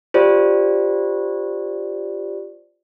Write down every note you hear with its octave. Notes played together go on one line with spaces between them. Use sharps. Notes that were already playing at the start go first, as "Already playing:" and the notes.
F4 G4 C5 D5